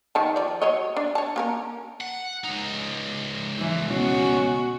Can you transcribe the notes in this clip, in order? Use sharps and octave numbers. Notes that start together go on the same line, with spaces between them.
D#3 A5
F3 D5
F#3 C#5 D#5
D4
C#5 A5
A#3 C#4 A#4
F#5
C#2 D#4
E3
B2 C#4 F#4